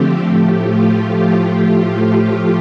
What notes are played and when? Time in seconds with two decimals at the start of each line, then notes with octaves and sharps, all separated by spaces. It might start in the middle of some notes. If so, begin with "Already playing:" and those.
Already playing: D3 F3 A3 C4 G4
0.26 A2 F3 A3 G4
0.69 F4